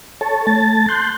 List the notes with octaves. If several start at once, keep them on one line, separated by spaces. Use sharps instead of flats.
A4 C#5 A5
A3 A5 A6
C6 F#6 G6